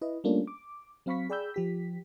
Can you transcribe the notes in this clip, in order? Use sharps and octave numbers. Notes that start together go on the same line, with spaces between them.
E4 B4 D#5
G3 A3 A#3 C#4 D4 F4
D6
F#3 C4 F5 B5 C#6 B6
G#4 D5 G5 B5 E6 G6
F3 G4 B6